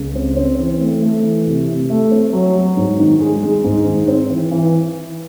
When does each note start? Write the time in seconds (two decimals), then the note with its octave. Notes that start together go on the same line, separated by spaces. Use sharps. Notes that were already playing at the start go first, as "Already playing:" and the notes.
Already playing: C#2
0.15 C4
0.37 C4
0.59 E3
0.80 A3
1.02 A3
1.23 E3
1.46 C3
1.67 C3
1.90 A3
2.11 C4
2.33 F#3
2.55 F#3
2.77 G#2
2.99 D#3
3.20 G#3
3.43 G#3
3.64 G#2
3.86 D#3
4.08 C4
4.30 E3
4.51 E3